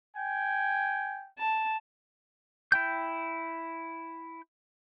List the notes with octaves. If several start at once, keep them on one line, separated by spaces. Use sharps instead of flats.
G5 G#5
A5
E4 G5 G6